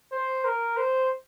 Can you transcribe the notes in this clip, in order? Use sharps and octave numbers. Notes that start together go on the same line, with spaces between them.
C5
A#4
C5